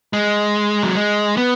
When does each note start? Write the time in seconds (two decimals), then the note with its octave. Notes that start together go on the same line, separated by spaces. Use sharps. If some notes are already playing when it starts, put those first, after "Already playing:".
0.13 G#3
0.83 F#3
0.95 G#3
1.37 B3